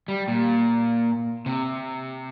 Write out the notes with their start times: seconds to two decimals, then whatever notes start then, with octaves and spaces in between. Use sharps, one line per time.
0.08 G3
0.28 A#2
1.46 C3